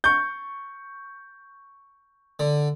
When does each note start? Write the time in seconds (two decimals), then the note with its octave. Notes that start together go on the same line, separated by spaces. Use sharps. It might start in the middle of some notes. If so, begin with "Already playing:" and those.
0.04 C#6 G6
2.39 D3